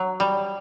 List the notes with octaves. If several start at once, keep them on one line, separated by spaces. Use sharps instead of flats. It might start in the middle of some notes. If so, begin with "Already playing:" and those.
Already playing: F#3
G3